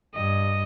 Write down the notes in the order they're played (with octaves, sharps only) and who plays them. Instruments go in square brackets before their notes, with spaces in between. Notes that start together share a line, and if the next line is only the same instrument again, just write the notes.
[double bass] G2 [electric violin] D#5